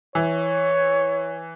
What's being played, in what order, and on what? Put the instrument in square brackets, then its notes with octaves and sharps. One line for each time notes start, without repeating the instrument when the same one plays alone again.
[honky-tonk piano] E3 [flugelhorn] C#5